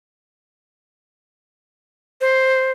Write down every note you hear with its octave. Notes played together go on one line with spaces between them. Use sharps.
C5